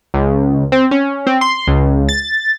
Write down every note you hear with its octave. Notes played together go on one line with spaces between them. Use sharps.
C#2
C4
C#4
C4
C6
C#2
A6